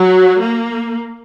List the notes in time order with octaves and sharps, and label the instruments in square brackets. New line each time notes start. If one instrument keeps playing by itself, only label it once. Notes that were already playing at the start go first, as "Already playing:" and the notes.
Already playing: [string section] F#3
A#3